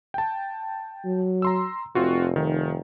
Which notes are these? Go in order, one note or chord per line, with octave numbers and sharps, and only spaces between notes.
G5 A5
F#3
A#5 C6 E6
F1 C4 F4 F#4
D#3